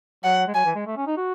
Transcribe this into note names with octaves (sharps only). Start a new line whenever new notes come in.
F#3 F#5
G#3
F#3 G#5
E3
G#3
A3
C#4
D#4
F#4